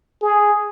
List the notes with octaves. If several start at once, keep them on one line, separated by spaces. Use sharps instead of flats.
G#4